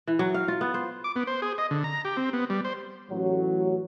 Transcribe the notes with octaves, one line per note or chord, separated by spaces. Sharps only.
E3
F#3
F5
F4
B3
C5
D6
B3
C5
G#4
D#5
D3
A#5
G4
C4
B3
G3
C5
A1 F#3